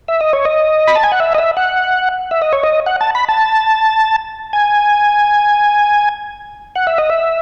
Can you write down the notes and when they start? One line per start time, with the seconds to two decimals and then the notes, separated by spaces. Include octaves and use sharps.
0.08 E5
0.21 D#5
0.33 C#5
0.45 D#5
0.87 B5
0.95 A5
1.04 G#5
1.12 F#5
1.20 E5
1.35 D#5
1.38 E5
1.57 F#5
2.31 E5
2.42 D#5
2.53 C#5
2.63 D#5
2.86 F#5
3.01 A5
3.15 B5
3.29 A5
4.53 G#5
6.76 F#5
6.87 E5
6.98 D#5
7.10 E5